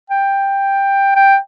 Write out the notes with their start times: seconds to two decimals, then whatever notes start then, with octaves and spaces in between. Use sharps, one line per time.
0.10 G5
1.15 G5